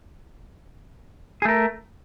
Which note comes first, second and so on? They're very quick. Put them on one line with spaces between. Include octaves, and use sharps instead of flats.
G#4 A3 A#4